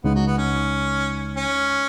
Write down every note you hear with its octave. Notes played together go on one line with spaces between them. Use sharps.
C#2 C#3 G#3 B3 D#4
F#3
B3
C#4
C#4